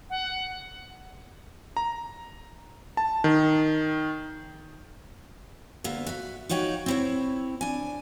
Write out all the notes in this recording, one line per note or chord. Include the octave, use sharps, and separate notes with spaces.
F#5
A#5
A5
D#3
D2 A#3 B3 E5
F#4 E5
D#4 F4 F#4 C#5 G5
C4 E4 C#5
D4 G#5